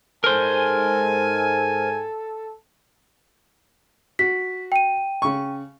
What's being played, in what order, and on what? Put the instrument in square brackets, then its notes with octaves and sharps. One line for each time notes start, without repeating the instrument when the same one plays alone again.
[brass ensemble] G#2 G#5 [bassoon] A4 [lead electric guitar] A#4 C5
[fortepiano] F#4 [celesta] B6
[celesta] G5 D#7
[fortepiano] C#3 C#6